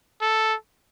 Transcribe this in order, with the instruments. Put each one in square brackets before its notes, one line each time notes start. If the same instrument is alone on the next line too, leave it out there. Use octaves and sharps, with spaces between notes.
[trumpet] A4